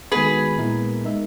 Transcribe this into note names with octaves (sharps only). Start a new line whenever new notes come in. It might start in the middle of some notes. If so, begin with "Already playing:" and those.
D#3 G#3 B3 F#4 G#4 B4
A#2 G#3 B3 E4 A#4
G#3 D#4 A#4 E5